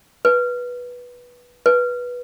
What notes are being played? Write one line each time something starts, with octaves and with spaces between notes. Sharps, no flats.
B4
B4